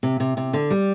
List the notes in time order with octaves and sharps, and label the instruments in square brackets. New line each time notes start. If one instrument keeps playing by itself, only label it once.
[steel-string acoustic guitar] C3
C3
C3
D3
G3